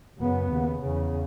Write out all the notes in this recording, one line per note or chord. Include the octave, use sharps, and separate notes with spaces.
F#2 C#3 B3
D#2 C#3
E2 C#3